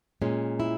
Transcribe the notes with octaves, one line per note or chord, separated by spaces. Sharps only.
A#2 G#3 C#4
E4